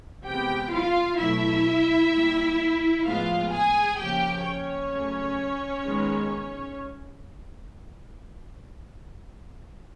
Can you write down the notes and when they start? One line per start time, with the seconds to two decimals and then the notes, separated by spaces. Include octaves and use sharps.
0.24 C3 E3 G#3 B3 G4 G5
0.72 F4 F5
1.18 B2 F#3 A3 E4 E5
2.11 A#2 G3 A#3
3.05 A2 F3 G#3 B3 F4 F5
3.51 G#4 G#5
3.98 C#3 F3 A#3 G4 G5
4.45 C#4 C#5
4.92 C#3 F#3 A3
5.85 D#3 G#3 B3